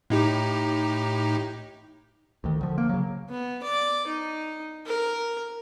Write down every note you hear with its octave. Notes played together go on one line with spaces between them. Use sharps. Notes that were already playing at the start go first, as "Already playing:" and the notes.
A2 D#4 G4
D2 D#3
D3 F3
A#3
C#3 F#3
B3
D5
D#4
A#4